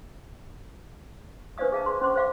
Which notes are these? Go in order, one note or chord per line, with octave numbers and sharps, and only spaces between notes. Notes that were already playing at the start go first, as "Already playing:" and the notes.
D4 B4 C5 D5 F5 D#6
G#4 F5 A5
C6
C#4 C5 C6 D6
C5 F5 D6